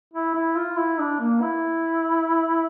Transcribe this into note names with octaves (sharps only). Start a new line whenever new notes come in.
E4
E4
F4
E4
D4
A#3
E4